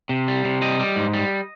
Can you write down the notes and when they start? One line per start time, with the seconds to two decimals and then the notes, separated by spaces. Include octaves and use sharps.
0.09 C3
0.28 G3
0.45 C3
0.62 G3 D#5
0.79 G3
0.96 G#2
1.14 G3